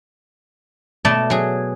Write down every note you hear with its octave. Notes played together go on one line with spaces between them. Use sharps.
B2 A3 D5 A5
F#3 G#4